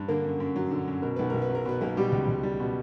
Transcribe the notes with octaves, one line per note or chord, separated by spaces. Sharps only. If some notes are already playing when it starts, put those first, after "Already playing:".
Already playing: G2
D3 A#3 A#4
F#2
F#2
F#3
D3
F#2
B2 A#4
B1 B4
B1 A#4
B4
F#3
A#4
B2 B4
B1 A#3 A#4
B2 G3 G4
C#2
C#2
G3
B2